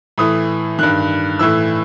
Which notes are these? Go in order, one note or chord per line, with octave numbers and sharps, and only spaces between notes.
A2 E3 D#6
G2 D#3 F#6
A2 E3 E6